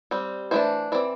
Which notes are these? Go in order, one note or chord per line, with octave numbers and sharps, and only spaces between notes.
G3 C4
E3 A3 D4 C5
E3 C4 D5